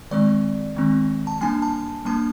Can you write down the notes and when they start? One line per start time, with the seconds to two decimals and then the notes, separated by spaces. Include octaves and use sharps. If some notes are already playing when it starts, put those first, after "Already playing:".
0.11 D#3 G#3 C4 D5
0.76 D#3 G#3 C4
1.27 A5
1.41 G3 A#3 D4 G#5
1.62 A5
2.05 G3 A#3 D4 A5